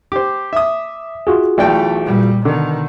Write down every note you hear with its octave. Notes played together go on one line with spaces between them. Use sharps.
G4 C5 D6
E5 D#6
F4 F#4 G#4
B1 E3 A3 D5 G5
A#2 G3
B2 D3 D#3